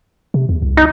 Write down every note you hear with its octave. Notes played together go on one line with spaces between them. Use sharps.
C3
E2
C2
D#4